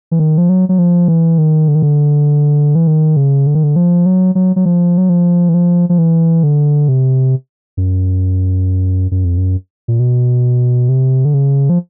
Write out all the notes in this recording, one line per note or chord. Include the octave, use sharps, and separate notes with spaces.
E3
D#3
F3
F#3
F#3
F3
E3
D#3
D3
D#3
D3
E3
D#3
C#3
D3
D#3
D3
F3
F#3
F#3
F#3
F3
F#3
F3
E3
F3
F3
E3
D3
C3
F#2
F#2
F2
F#2
A#2
B2
C3
D3
C#3
F3